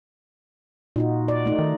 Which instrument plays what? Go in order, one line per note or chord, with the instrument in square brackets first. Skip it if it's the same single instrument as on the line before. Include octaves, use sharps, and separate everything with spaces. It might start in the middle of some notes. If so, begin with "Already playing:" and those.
[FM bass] A#2 [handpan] D#4 F4 F#4
[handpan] D5
A3 D#4
[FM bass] D#3